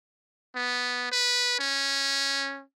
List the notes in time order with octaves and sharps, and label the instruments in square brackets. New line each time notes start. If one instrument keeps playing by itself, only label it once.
[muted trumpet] B3
B4
C#4